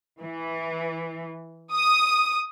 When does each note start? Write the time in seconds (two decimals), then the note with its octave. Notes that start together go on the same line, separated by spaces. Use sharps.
0.21 E3
1.73 D#6